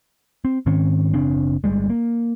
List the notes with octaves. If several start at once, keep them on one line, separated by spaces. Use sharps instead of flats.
C4
G#2 D#3 C4 C#4
F#1 C#3 C4 D4
G1 D#2 G3 G#3
A#3